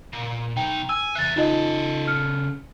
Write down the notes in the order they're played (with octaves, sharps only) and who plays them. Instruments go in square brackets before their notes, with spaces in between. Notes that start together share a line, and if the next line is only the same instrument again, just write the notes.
[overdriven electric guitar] A#2
[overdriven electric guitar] B1 D#4 [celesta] G5
[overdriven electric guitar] G#5 [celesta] E6
[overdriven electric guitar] E2 E5 [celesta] F#6 A6
[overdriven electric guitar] C#3 A4 [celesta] D#4 F4 D#5
[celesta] F6 C#7